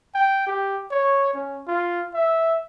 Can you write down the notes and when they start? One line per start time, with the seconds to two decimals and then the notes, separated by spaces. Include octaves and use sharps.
0.15 G5
0.47 G4
0.91 C#5
1.34 C#4
1.68 F4
2.14 E5